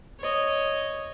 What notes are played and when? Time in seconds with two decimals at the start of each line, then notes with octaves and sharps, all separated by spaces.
0.20 C#5 D#5